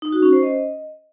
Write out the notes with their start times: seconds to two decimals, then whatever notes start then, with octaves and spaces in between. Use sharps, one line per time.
0.02 D#4
0.12 F#4
0.22 C#4
0.33 C5
0.43 D#5